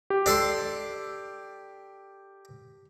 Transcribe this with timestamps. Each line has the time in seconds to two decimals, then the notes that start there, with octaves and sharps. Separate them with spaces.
0.10 G4
0.26 D4 A4 C6